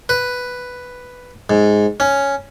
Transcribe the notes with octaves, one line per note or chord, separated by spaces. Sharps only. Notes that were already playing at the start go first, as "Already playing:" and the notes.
B4
G#2
C#4